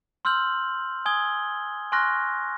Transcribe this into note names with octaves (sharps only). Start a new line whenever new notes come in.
C6 E6 F6 G6 F#7
G#5 D#6 G#6 G7
G#5 C6 C#6 F6 F#6 A#6